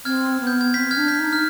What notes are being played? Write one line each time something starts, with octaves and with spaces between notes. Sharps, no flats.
C4 F6 G#6
B3
G6
G#6
C4 G6 B6
F6 G#6
D4
G6 B6
D#4
F6